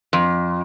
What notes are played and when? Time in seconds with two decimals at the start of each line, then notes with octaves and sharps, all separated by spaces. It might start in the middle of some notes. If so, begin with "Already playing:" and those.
0.13 F2